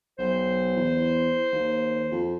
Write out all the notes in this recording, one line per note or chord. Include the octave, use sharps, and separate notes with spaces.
B1 C5
E2
D#2
F2